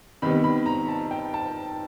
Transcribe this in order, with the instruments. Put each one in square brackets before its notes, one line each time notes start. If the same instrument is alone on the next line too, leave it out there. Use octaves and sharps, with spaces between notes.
[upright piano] C3 D#3 G3 B3 B5
B5
A#5
A5
G5
A5